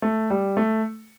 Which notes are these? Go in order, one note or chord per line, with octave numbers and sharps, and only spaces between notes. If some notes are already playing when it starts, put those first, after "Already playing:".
A3
G3
A3